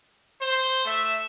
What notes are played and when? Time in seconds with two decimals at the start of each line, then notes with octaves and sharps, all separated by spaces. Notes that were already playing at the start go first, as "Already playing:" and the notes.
0.41 C5
0.85 A3 E5